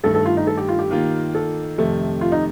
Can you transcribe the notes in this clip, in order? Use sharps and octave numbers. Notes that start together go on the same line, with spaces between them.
G2 D#3 A3 A4
A4
F4
D#4
A4
G4
F4
G4
D#3 A#3 F4
A4
F2 C3 D#3 A3
F4
D#4